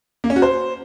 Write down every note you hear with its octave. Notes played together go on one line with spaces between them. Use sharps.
A#3
C#4
F#4
C5